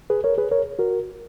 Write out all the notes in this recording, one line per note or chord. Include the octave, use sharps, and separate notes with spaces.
G#4 B4
A#4 C#5
G#4 B4
A#4 C#5
F#4 A#4